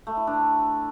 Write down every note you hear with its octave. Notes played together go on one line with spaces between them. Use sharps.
A3
E4
D4